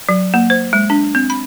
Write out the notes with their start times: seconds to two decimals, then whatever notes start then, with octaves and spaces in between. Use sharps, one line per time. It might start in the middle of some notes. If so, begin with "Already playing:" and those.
0.09 F#3
0.34 A#3
0.50 C5
0.73 G#3
0.90 D4
1.15 C4
1.30 B5